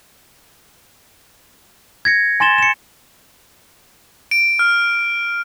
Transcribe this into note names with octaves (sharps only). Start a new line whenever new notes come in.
G#6 A#6 C#7
G#5 C6 A6 E7 G7
C#7 E7
D7
F6